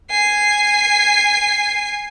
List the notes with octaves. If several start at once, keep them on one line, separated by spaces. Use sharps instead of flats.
G#5 C7